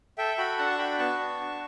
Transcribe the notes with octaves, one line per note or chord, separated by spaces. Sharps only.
A4 E5 G5
F#4 G5 B5
D4 F#5 A5
C#6
F#4 G5 B5
B3 A5 C#6
D4
F#4